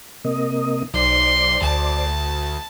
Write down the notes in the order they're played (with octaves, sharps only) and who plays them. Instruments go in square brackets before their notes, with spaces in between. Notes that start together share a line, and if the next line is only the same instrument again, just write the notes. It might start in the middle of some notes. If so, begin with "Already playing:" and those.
[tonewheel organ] C3 A#3 D#5
[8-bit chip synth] B1 [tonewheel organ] C5 D5 [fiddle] C6
[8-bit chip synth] D2 [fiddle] A5